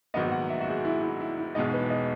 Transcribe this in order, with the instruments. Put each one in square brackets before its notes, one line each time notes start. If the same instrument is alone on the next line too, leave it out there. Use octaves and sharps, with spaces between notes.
[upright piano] A#1 G#2 D#3 F#3 B3 [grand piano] D#5
[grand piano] F#5
E5
F#4
G#4
E4
E4
E4
E4
[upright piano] E1 E2 B2 G#3 D#4 [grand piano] D#5
[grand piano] B4
D#5